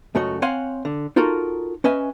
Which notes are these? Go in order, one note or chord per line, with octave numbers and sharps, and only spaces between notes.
C#2 F#2 A3 F#4 C#5 D#5
C4 C#5 F5 F#5 G#5 C6
D3
D#4 F4 F#4 A4 A#4
C#4 B4 D#5 E5 G#5